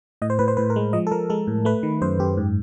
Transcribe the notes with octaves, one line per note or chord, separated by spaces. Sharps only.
A2 D#5
C5
A2 B4
C5
A2 B4
A#4
G#3
F3 D#5
A4
F3 A#4
G#3 A4
A2
A3 B4
D#3
F#2 C5
F#2 G4
G#2